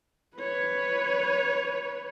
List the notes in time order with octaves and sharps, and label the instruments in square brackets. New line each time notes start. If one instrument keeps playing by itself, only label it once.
[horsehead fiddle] B4 C#5